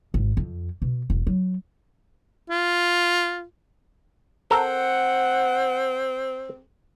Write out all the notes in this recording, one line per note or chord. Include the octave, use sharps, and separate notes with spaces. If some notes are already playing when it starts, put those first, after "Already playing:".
G#1
F2
B2
E1
F#3
F4
C4 A4 A#4 F#5 A#5